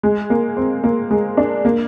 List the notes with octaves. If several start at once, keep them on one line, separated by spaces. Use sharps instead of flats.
G#3
A#3
C4
A#3
G#3
D4
A#3